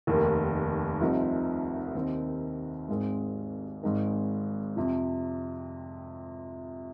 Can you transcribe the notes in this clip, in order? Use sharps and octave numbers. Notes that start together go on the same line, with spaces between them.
F1 D#2 D#3 A#3
C2 C3 F3 C4 D#4
D#2 D#3 C4 D#4
G#1 G#2 G#3 C4
G#1 G#2 G#3 C4 D#4
F2 C3 F3